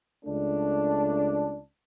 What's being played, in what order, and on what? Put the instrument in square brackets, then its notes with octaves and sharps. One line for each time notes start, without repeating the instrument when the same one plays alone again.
[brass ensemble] C#2 A3 D4